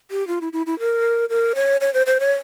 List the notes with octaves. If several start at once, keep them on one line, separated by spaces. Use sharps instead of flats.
G4
F4
E4
E4
E4
A#4
A#4
C#5
C#5
C5
C5
C#5